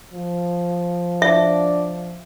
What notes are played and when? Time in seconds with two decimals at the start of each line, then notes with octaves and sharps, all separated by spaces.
0.14 F3
1.22 D4 E5